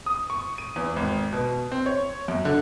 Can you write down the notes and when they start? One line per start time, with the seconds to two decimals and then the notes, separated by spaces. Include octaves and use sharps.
0.06 D#6
0.30 C#6
0.58 D#7
0.76 E2
0.96 G#1
1.33 B2
1.71 C4
1.86 C#5
2.28 F#2
2.45 D3